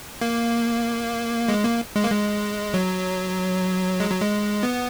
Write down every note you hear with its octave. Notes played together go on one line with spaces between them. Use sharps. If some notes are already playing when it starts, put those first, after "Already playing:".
A#3
G#3
A#3
G#3
A#3
G#3
F#3
G#3
F#3
G#3
B3